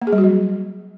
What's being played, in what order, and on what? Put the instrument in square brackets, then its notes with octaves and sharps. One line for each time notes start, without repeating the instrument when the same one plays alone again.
[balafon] A#3
G#4
G3
F#4
F#3